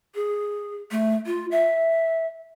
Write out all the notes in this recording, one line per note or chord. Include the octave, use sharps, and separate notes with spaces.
G#4
A3
F4
E5